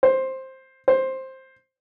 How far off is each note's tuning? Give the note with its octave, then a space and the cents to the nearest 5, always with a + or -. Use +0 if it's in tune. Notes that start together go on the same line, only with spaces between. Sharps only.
C5 +10
C5 +10